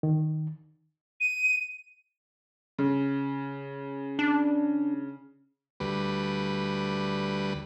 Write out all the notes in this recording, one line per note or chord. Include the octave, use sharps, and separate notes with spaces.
D#3
D#7
C#3
D4
D2 G3 B4